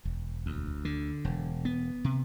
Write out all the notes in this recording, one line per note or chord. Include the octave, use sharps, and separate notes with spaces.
E1
D2
D3
E1
B3
C3